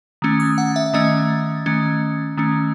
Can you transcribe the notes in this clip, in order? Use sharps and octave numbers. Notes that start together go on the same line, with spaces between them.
D#3 A3 C#4
D#6
F#5
E5
E5
D#3 A3 C#4 D#5
D#3 A3 C#4
D#3 A3 C#4